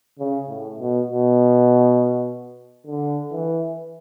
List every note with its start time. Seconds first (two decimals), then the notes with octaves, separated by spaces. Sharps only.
0.19 C#3
0.49 A2
0.80 B2
1.08 B2
2.87 D3
3.32 E3